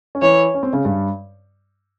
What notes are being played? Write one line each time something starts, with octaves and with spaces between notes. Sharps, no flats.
C#4
E3 E4 C#5
C#4
C4
C#3 C#4
G2 G3